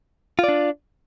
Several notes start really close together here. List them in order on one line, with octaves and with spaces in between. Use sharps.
F4 D5 D4